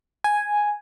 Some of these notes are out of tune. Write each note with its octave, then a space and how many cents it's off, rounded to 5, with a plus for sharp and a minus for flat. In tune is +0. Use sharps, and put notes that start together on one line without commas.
G#5 +0